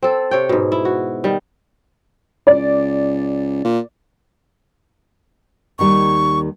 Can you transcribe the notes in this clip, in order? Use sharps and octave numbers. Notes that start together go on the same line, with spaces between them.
C4 A4
C3 C#5 G5
G#2 B2
E4
F#4
D#3 G3
C#2 D5
A#2
D#2 D#3 G3 C#6